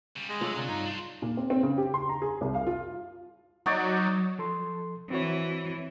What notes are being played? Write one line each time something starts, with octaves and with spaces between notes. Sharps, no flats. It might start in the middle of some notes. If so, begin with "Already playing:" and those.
C#3 G3
G#3
F#3 A3 F4 A4 C#5
D2 C3 D4
G2 D#4
D4 C5
A#2
C4
C4
C#3
G4
C6
A#5
G#4
C2
F5
F4
F#3 D#4 C#5 D5
F3 A4 C6
E3 C4 F#4 C#5